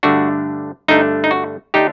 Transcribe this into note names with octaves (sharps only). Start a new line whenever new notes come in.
G2 D3 A3 D4 F#4
G2 D3 A3 D4 D#4
D#4
F#4
D3 A3 D4 D#4 G4